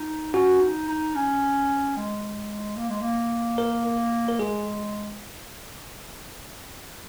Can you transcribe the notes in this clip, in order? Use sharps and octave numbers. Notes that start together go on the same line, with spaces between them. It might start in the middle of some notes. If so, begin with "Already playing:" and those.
Already playing: D#4
C#4 F#4
D#4
D#4
C#4
G#3
A#3
G#3
A#3
A#4
A#4
G#3 G#4